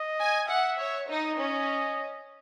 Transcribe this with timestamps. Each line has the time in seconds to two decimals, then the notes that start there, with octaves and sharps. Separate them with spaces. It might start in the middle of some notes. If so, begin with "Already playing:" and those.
Already playing: D#5
0.19 G#5
0.48 E5 F#5
0.78 C#5
1.08 D#4 D#5
1.38 C#4